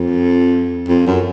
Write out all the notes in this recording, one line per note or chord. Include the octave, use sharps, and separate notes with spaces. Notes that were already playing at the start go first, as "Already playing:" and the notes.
Already playing: F2
F2
F#2